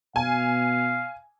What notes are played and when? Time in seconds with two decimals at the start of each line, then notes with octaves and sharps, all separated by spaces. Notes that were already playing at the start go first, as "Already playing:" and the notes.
0.16 B2 F5 G#5